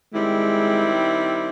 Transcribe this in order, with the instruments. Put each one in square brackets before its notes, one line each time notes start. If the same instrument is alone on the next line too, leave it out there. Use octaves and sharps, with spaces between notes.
[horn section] D#3 G3 C4 E4 [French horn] G#3